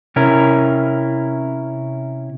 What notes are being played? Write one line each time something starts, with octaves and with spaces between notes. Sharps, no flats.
C3 C#4 E4 A#4